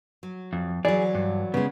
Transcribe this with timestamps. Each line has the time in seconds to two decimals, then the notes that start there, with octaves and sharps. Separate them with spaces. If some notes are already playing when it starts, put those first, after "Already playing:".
0.23 F#3
0.53 F2
0.85 E3 F#3 G#4 D5
1.15 G2
1.54 C#3 G#3 B3